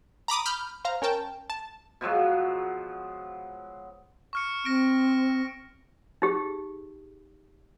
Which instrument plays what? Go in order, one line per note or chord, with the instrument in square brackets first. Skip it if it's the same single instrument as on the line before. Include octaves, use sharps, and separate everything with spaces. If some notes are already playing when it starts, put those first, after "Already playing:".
[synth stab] A#5 B5 D6 D#6
B5 F6 G6
C5 F5 A#5
C#4 A#4 G5 A5
A5
[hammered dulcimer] B2 F3 F#3 G#3
[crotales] C#6 F6 C#7
[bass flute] C4 [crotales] F6 A#6 D7
[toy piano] D#4 G4 G#4